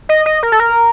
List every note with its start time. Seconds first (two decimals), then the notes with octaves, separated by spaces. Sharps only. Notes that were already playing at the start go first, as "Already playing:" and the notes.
0.09 D#5
0.26 D#5
0.43 A#4
0.52 A4
0.60 A#4